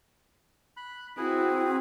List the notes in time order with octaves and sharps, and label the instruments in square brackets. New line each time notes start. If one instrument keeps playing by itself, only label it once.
[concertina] B5 F#6
[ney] C4 [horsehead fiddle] E4 F#4 [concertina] G#4 B4